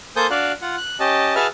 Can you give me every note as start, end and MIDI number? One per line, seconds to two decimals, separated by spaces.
0.16 0.27 58
0.16 0.27 69
0.16 0.27 72
0.16 0.27 80
0.16 0.27 87
0.16 0.27 91
0.30 0.52 62
0.30 0.52 66
0.30 0.52 74
0.30 0.52 77
0.30 0.52 90
0.61 0.76 65
0.61 0.76 78
0.77 0.98 90
1.00 1.35 61
1.00 1.35 67
1.00 1.35 75
1.00 1.35 81
1.35 1.47 66
1.35 1.47 68
1.35 1.47 71
1.35 1.47 76
1.35 1.47 81
1.35 1.47 89